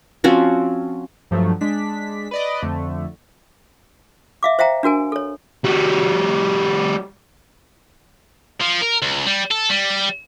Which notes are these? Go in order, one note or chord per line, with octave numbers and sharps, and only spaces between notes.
F3 C4 C#4 F#4
G2 F3 F#3 A3
G#3 D4 B6
B4 D5 D#5
F2 D3 A3
E5 F5 D6
C5 E5 F5 G5 A#5
D4 F#4 A#4 G#5
A4 C#5
G3 F#4
F3
A#4
C#2
G3
A4
G3